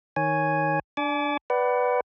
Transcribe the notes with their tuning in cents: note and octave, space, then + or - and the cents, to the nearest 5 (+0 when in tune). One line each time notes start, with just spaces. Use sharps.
D#3 +5 C#5 +0 G#5 +0
D4 +0 G#5 +40 D6 -25
B4 +0 D5 +0 F#5 +30